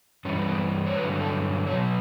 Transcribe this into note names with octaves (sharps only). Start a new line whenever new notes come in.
G2 E3 G3 C#4
B3
C#5
G2 D3 F#3 B4
A4
B2 F#3 C#5